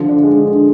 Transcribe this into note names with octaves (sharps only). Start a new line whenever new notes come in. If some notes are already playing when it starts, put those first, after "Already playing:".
Already playing: D3 F3
D4
G#3
D3
D3